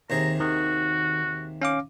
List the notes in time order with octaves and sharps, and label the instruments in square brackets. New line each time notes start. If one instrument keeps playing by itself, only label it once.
[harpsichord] D#2 C3 G#4 [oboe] A#5
[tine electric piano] D#3 [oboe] F#4
[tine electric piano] C#4 F5 D6